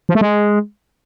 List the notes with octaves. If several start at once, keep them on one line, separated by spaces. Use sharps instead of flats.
F3
A3
G#3